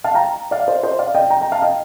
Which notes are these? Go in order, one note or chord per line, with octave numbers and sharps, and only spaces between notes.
F5 A5
G5 A#5
D5 F5
C5 D#5
C5 D#5
D5 F5
D#5 G5
G5 A#5
G5 A#5
F5 A5
D#5 G5